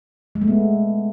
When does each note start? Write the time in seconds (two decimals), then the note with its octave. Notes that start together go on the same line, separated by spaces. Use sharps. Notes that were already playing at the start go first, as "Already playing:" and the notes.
0.35 G#3
0.42 A3
0.48 B3